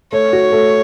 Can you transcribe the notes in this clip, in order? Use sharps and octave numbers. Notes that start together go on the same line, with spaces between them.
A3 C#5
F#4
A3